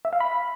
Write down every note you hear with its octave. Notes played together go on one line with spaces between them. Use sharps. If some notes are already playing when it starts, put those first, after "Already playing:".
E5
F5
B5